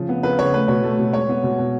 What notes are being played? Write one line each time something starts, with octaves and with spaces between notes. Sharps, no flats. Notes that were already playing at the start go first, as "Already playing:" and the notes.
Already playing: C#3 F3
B3
C#3 B4
C#3 C#5
A3 B4
B2 C#5
A3
B2
G#3 C#5
B3
B2
B2